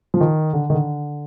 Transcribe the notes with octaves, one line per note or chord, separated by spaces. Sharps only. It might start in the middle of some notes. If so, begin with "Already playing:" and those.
F3
D#3
D3
D#3
D3